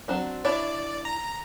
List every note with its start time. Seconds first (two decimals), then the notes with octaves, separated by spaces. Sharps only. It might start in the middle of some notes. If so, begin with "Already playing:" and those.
0.08 F#3 C4 D4
0.45 D4 E4 C#5 D5
1.05 A#5